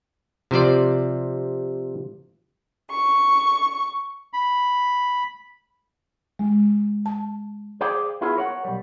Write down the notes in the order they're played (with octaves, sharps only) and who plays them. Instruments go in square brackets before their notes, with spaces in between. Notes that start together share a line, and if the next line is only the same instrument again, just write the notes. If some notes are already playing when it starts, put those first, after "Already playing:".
[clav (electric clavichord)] C3 F3 C5 D5
[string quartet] C#6
[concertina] B5
[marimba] G#3
A5
[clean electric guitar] G#4 C5 D5 F5 G5
B3 E4 F4 G#4
A#4 C#5 F#5
B1 G3